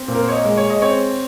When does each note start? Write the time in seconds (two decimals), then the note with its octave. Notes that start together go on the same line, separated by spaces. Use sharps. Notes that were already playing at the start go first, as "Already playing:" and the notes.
Already playing: C4
0.08 A#2 C5
0.15 A#4
0.23 C5
0.28 C#5
0.32 D#5
0.45 G#3
0.57 C#5
0.70 D#5
0.82 C4 C#5